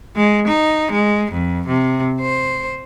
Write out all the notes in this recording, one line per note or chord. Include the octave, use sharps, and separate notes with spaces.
G#3
D#4
G#3
F2
C3
C5